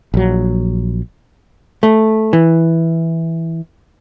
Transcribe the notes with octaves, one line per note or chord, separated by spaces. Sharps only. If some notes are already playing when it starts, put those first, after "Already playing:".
A#1 F#3
A3
E3